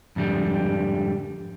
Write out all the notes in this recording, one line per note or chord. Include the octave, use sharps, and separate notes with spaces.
F2 G#2 D3 G3